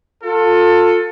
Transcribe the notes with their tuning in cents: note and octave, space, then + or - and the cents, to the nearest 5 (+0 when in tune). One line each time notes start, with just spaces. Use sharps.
F4 +30 A4 +20